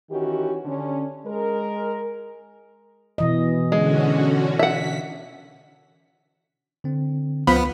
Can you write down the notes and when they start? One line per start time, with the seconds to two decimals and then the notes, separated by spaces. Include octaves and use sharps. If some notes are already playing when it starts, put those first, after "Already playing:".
0.11 D#3 E3 C#4 F#4 G4
0.66 D3 C#4
1.26 G#3 A#4
3.18 B2 E3 D#5
3.72 D3 G#3 C#4 F#4
4.59 E5 F#5 B6
6.84 D3 C4
7.47 C#2 F3 B3 B5